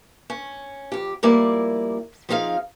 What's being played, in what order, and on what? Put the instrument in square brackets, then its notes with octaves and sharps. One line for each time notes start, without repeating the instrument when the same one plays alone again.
[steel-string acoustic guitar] C#4
F2 G4
F2 G3 A#3 E4 D5
F3 C4 D#4 G#4 F5